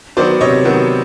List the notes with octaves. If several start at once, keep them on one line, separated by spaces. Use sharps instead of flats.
D#3 F#3 B3 C5 D5
C3 C#5 D#5
D#3 F#3 B3